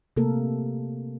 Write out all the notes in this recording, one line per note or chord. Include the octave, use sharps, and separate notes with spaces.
C3 A3 A#3 A4 A#4